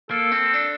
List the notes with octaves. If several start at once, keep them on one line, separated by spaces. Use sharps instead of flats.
A#3 A4
C4
D4